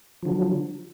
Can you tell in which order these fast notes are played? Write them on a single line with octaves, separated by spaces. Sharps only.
F3 D3 F#3